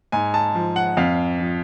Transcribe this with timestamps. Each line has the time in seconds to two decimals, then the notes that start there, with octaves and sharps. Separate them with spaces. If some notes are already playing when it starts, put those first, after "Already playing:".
0.12 G#2 G#5
0.34 A5
0.55 F3
0.76 F#5
0.97 F2 F5
1.40 F3